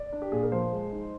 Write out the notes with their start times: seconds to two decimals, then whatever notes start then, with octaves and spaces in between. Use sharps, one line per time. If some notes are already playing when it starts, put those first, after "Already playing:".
Already playing: D5
0.12 D4
0.22 G4
0.32 A#2 G#4
0.43 A#4
0.52 F3 C5
0.72 G#3
0.92 D#4